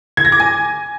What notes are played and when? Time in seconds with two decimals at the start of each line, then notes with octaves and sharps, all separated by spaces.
0.17 G#6
0.25 A#6
0.32 D6
0.40 G#5